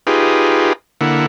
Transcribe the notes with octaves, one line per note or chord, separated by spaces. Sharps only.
D#4 F4 G4 G#4 B4
D3 A#3 E4 F#5